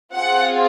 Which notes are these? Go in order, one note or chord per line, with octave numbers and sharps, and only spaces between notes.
C4 F4 G#4 F#5